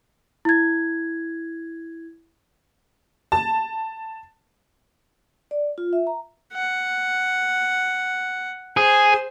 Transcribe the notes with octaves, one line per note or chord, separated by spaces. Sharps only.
E4 G#6
A5
D5
F4
E5
A#5
F#5
G#4 C5